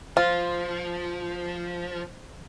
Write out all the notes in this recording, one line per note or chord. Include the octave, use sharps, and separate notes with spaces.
F3 F4 C5